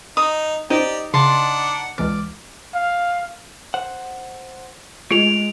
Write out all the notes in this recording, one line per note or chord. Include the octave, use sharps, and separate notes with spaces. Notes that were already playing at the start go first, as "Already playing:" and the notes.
D#4 A#5 D#6
D#4 G4 C5 D5 D#5
C#3 D4 F#5 A5 C6
C#2 E3 D5 F6
F5
C5 F#5
G#3 A3 F4 G#4 D7 F7